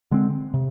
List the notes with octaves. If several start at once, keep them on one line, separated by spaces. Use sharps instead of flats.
D3 G#3 C4
C3